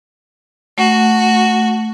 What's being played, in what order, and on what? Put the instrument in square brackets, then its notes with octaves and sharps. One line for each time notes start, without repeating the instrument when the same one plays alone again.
[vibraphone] A3 [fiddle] F#4